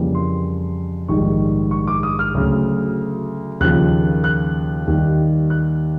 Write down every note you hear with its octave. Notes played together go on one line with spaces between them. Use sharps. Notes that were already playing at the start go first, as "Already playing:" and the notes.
Already playing: F2 C#3 E3 G3 A#3
C6
A#1 G#2 D#3 G3 C#6
C#6
D6
D#6
F6
D2 C#3 F#3
D#2 C#3 F3 A#3 F#6
F#6
D#2 D#3 G3
F#6